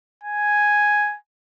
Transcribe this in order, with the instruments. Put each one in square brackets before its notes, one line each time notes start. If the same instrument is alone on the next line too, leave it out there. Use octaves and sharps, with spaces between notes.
[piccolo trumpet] G#5